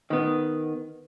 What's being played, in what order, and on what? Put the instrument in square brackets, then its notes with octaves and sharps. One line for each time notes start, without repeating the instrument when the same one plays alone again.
[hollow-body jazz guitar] D#3 B3